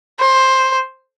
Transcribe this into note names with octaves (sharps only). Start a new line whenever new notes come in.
C5